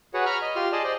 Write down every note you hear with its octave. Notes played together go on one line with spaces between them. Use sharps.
F#4 G#4 B4 C#5 F#5
A#5 B5 C#6 F6
D#5
F4 G4 C6 F6
G#4 D5 D#5 A5 C6
C5 D5 D#5